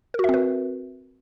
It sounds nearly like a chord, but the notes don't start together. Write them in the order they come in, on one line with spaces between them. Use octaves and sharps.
A#4 F#4 E5 C4 B4